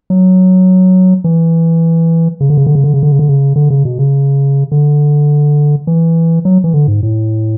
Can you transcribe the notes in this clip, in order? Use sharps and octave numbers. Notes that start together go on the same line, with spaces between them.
F#3
E3
C#3
D3
C#3
D3
C#3
D3
C#3
D3
C#3
D3
C#3
D3
C#3
B2
C#3
D3
E3
F#3
E3
D3
G#2
A2